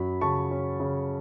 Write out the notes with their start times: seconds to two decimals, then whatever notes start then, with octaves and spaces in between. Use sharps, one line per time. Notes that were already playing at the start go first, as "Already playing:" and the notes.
Already playing: F#2 F#3 B5
0.21 C#3 A5 C#6
0.51 C#4
0.80 C#3